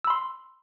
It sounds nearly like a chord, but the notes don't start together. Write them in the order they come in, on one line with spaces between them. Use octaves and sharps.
E6 B5 C6